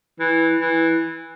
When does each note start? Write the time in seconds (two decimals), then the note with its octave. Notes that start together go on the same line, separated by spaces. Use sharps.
0.20 E3
0.60 E3